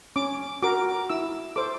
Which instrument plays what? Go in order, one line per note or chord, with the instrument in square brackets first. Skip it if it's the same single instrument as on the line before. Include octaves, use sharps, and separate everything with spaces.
[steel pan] C#4 D6
F#4 A#4 D6
E4 E6
A4 C5 D6